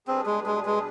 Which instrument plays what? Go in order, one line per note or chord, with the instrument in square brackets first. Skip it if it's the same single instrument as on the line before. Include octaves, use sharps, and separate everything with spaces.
[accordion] B2 G3 D4 G#4 B4 [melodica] C4
[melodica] G#3
G#3
G#3